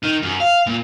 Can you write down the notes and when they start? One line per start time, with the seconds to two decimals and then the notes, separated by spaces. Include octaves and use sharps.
0.03 D#3
0.22 F#2
0.40 F5
0.67 A#2